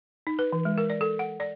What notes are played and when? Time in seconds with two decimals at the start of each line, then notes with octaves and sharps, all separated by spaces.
0.27 D#4
0.39 B4
0.53 E3
0.65 G#3
0.78 A#4
0.90 D5
1.01 A4
1.19 F#5
1.40 D5